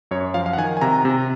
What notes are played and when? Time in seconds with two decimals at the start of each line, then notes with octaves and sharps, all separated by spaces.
0.11 F#2 C#5
0.34 F3 F5
0.46 F5
0.53 F#5
0.58 D#3 G#5
0.77 G#5
0.81 C3 A#5
1.05 C3